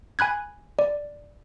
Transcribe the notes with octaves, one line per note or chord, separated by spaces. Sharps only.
G#5 B5 F#6 G#6
D5